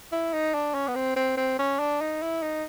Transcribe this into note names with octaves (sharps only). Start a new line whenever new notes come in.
E4
D#4
D4
C#4
B3
C4
C4
C4
C#4
D4
D#4
E4
D#4